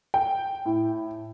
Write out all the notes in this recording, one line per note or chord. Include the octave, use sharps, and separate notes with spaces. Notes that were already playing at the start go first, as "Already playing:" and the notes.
G5
A2